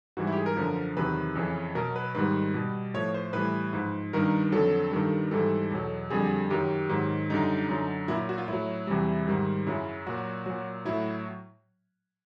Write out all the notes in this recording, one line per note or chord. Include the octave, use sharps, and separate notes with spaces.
G#2 E3 G3 F#4
E4
G4
G#4
A#4
F#2 D3 F3
E2 C3 D#3 F#3 B4
F2 C#3 E3
B2 F#3 A#4
B4
G#2 D#3 G3 B4
B2 G3
A2 F3 C#5
C5
A2 E3 G3 B4
G#2 F3
G2 D#3 G3 A#4
F2 D3 F#3 A4
G2 D#3 G3
G#2 E3 G3 A4
E2 B2 F#3
F2 D3 G3 G#4
F#2 D#3 F#3 G4
G#2 D#3 F#3
F#2 D3 G3 D#4
F#2 D3 F#3
A#2 F#3 E4
F#4
F4
A2 F#3 E4
E2 C3 E3 G3
G#2 D#3 G3
F#2 C#3 F#3 E4
A#2 F#3 F#4
A#2 F#3
A2 F#3 E4